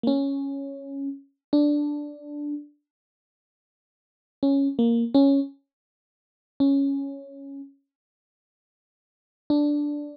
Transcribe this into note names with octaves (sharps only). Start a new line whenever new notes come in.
A#3
C#4
D4
C#4
A#3
C#4
C#4
D4